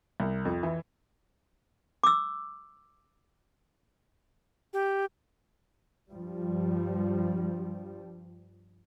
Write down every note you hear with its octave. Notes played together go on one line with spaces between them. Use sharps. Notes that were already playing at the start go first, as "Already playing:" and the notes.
C2
F2
E3
D6 E6
G4
G2 F3 G3